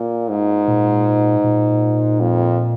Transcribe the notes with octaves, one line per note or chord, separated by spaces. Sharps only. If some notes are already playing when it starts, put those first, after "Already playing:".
Already playing: A#2
G#2
A#2
A#2
F2